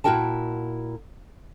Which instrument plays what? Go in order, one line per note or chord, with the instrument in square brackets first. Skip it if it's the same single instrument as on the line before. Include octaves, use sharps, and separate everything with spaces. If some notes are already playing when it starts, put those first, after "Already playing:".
[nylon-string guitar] A#2 E4 F#4 A#4 G5 A5